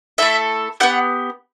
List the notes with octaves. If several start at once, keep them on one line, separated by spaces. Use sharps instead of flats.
A3 E4 A4 E5
B3 E4 G4 F#5